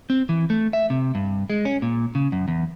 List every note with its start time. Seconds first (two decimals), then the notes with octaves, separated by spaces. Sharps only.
0.10 C4
0.29 E3
0.50 A3
0.73 E5
0.90 C3
1.15 G2
1.50 G#3
1.65 C#4
1.82 A#2
2.15 C#3
2.32 F#2
2.48 E2